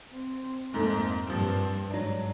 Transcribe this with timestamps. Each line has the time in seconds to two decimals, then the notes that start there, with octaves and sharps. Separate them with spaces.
0.13 C4
0.74 F2 G#2 A3 A#3
1.27 G2 F3 A#3 C4
1.90 G#2 F#3 D4